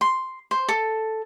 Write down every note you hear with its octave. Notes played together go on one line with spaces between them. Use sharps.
C6
C5
A4